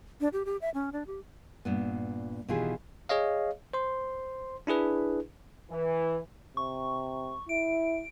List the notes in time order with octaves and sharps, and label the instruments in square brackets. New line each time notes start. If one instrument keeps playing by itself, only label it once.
[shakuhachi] D4
G4
G4
E5
C#4
D4
G4
[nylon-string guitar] G2 A#2 B3
B2 D#3 E3 F4 G4 G#4
[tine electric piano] G#4 C#5 D#5 F5
C5 C6
D4 E4 G#4 B4
[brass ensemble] E3
[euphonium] C3 [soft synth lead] C#6
[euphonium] E4 [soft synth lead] D7